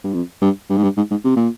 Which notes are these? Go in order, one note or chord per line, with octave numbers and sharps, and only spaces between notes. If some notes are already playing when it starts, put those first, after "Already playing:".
G2
F2
G2
G2
G#2
G2
G#2
G#2
C3
A#2